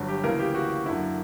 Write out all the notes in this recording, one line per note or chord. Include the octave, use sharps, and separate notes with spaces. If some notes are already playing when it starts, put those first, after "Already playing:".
Already playing: G1 G2 F#3
G4
D2 C#3 E3 A#3 A#4
G4
F#4
F#2 D3 A#3 E4